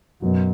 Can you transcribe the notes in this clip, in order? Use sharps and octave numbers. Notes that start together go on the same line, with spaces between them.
F#2 B2 F#3 B3 F#4